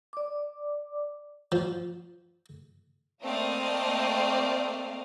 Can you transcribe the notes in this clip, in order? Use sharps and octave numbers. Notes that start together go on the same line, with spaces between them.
D5 D6
F3
A3 A#3 C4 D5 D#5 F5